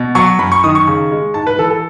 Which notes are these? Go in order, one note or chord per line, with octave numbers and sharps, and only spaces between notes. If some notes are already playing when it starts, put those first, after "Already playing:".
Already playing: B2
F#3 C#6
F#2 B5
C#6
D#3 D#6
C#6
C#3
G#3
G#2 A5
B4
E3 A4
A4